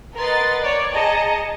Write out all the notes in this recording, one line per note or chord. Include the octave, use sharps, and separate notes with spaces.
A#4 B4 D#5 F#5 C6 A6
C#5 D5
G#4 D#5 A5 A#5 C#7